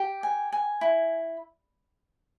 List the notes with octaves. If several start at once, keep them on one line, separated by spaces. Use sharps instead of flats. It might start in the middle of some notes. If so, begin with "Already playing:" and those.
Already playing: G4
G#5
G#5
E4